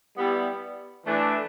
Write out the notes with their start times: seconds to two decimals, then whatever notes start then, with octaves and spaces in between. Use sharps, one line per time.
0.17 G3 B3 E4
1.06 E3 A3 D4